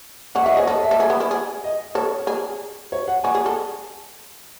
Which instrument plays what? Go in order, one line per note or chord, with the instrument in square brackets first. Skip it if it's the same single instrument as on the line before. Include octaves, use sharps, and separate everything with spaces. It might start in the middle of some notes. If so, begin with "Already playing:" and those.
[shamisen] C#4 [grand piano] F#5
[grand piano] E5
[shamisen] F#4
[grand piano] D#5
[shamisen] G#4 [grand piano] C#5
[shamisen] A4 [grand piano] D#5
[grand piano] E5
[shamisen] A4
G#4
B3
E4
G#4
[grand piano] D#5
[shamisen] A4 [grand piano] C#5
[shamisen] G#4
[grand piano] C#5
F#5
[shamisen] F#4 [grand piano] G#5
[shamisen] G#4
A4